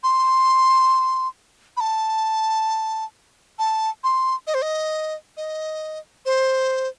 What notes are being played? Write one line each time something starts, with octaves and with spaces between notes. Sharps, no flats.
C6
B5
A5
A5
C6
D#5
C5
D#5
D#5
C5